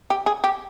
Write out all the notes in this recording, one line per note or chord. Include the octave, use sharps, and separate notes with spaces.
G4
G#4
G4